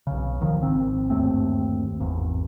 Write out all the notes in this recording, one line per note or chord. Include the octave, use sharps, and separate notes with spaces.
B1 C#3
D1 D#3 F3
G#1 C4
G1 D#2 A3 C4
G#1 E2